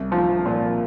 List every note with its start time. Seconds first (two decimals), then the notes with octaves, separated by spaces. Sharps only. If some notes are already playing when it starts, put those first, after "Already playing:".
Already playing: C2
0.12 F3
0.46 A#2